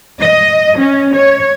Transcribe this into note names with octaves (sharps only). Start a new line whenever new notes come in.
D#5
C#4
C#5